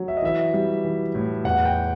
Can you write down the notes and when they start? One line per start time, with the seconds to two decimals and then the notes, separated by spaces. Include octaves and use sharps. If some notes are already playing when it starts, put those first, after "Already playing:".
Already playing: F#3
0.08 E5
0.17 D#5
0.22 E3 E5
0.54 G3
0.84 E3
1.15 A2
1.44 E2 F#5
1.65 G5